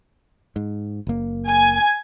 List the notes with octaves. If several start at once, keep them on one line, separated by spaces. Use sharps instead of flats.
G#2
F#1 A#3
G#5